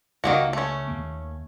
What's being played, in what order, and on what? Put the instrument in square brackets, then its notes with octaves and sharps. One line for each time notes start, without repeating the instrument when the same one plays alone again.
[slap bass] C#2 [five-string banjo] D#3 A#3 F#4
[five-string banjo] A3 C#4
[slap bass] D#2 A#3